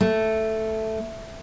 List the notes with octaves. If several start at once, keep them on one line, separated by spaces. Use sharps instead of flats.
A3